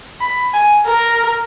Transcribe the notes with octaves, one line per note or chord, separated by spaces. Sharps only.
B5
G#5
A#4